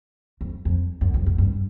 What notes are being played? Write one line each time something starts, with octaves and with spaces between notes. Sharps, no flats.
F2
F2
F#2
F2
F#2
G2